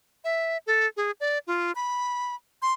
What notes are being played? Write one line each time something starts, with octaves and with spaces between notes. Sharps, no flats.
E5
A4
G#4
D5
F4
B5
C6